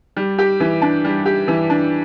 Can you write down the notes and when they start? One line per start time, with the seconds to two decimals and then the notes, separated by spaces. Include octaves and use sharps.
0.16 G3
0.38 G4
0.60 E3
0.82 D4
1.05 G3
1.25 G4
1.48 E3
1.70 D4